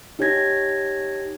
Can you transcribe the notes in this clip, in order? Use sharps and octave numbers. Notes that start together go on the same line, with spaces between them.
D#4 G4 C#5 G#5 G#6 A#6